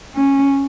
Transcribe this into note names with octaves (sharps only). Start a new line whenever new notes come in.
C#4